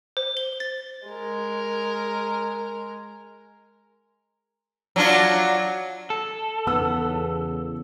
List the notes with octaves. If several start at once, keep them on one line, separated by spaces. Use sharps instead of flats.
C5
G7
A6
G#3 A#4
F#3 D4 F4
A4
E2 C#3 B3 E6